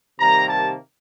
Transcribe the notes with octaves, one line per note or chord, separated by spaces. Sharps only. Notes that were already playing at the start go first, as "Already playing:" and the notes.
C3 D#3 G3 A#3 A#5
A5